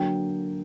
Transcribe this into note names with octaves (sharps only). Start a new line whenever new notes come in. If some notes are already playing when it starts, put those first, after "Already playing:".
Already playing: D3 F#3 A#3 G5